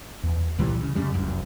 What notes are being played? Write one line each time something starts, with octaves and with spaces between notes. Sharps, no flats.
E2
C#2 A#2 E3 G3
C#3
F#2 C#3 G3
F1 C2 F#2